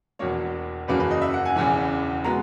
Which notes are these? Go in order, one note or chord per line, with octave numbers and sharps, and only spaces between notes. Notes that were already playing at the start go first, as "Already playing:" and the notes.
E1 E2 B2 A#3 C#5
F#1 E2 C#3 F#3 A#3 B4
B4
D#5
E5
F#5
G#5
E1 E2 C#3 E3 G#5
B2 G#3 B3 A#5